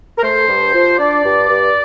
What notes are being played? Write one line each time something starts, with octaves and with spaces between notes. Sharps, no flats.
A#4
A3 C5
G2
F3
D4 D5
G2
G2